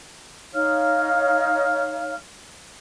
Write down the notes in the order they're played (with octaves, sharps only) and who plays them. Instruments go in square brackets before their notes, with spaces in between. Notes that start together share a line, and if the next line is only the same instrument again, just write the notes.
[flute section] D#4 C#5 F5 F6